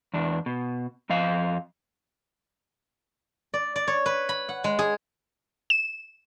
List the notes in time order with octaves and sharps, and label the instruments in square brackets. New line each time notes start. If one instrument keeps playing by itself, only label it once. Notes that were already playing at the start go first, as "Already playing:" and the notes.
[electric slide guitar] E2 D4
B2
F2 F3 D#5 F5
[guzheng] D5
D5
C#5
B4
B5
F#5
G#3
G#4
[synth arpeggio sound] E7